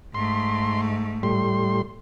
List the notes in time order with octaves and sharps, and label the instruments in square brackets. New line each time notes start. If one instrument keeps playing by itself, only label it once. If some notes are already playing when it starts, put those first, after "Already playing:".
[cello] G#2 A3 [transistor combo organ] C6
[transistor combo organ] A2 G3 C6